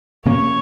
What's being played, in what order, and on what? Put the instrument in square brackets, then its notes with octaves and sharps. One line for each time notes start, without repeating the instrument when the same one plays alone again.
[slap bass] C3 F3 A#3 C#4 [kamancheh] C#5